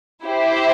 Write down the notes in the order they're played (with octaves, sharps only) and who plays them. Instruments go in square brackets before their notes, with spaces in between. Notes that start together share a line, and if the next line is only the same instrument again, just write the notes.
[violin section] E4 G4 C5